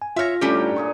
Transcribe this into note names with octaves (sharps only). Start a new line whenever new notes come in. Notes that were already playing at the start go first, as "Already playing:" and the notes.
G#5
F4 C#5 E5 F6 A#6
A2 G3 C#4 D4 G4
D4 A#5
A#2 G#4 C#6